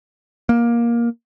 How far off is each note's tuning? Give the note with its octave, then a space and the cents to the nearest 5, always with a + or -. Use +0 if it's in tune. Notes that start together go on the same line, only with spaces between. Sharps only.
A#3 +15